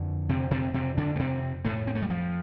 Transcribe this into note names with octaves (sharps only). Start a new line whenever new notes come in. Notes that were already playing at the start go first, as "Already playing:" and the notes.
Already playing: F2 D3
C3 C4
C3 C4
C3 C4
D3 D4
A3
C3 C4
A2 A3
C4
A3
G3
F3